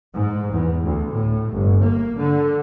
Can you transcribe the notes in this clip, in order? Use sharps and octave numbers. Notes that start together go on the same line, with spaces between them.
G#2
E2
D2
A2
G1
A#3
D3